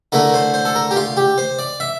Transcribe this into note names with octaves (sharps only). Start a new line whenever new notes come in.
D3 A3 E4 A#4
C5
C5
A4
A#4
G4
F4
G4
C5
D5
E5